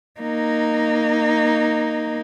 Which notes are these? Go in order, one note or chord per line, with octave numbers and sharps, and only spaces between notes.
A#3 D#4